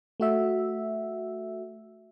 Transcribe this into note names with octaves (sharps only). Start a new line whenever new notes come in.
A3 F#4 E5